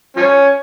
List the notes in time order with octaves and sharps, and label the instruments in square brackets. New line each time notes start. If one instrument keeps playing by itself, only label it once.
[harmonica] F3 C#4